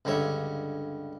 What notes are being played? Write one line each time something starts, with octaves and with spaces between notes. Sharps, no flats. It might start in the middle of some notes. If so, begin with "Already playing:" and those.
C#2 G2 D3 C#5 E5